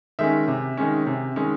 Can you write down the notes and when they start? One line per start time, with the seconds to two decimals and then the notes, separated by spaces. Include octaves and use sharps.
0.19 D#3 G#3 C#4 E5
0.48 C3
0.77 D#3 G#3 C#4
1.07 C3
1.36 D#3 G#3 C#4